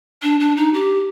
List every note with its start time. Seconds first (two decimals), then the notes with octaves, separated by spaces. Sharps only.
0.23 D4
0.40 D4
0.56 D#4
0.73 G4